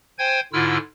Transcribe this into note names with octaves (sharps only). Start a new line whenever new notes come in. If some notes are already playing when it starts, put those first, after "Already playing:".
C5 G5 G#5 G#6
G#2 D3 E4 F4 E6 F6